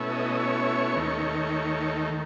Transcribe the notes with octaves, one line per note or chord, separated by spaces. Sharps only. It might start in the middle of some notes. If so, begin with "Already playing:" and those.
Already playing: B2 A3 C#4 E4
D#5
C#5
D#2 D#3 A3